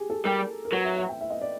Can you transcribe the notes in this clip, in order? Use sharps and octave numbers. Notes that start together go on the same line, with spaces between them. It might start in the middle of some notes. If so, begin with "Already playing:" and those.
Already playing: G4 G#4
A4
G3 A#4
A#4
F#3 B4
E5
E5
G5
E5
D#5
D5